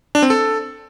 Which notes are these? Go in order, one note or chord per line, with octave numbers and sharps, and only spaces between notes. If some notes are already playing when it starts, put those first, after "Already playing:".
D4
C4
A4